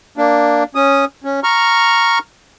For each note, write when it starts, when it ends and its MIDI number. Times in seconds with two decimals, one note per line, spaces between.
0.18 0.64 58
0.18 0.64 62
0.75 1.05 61
0.75 1.05 87
1.24 1.40 61
1.44 2.19 82
1.44 2.19 85
1.44 2.19 89